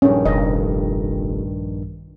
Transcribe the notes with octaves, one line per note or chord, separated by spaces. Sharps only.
A#1 G2 D#3 C#4
F1 D#5